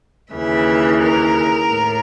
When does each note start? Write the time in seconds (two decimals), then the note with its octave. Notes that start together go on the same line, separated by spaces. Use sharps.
0.33 D#2 C#3 E3 E5
1.03 A#4
1.71 A2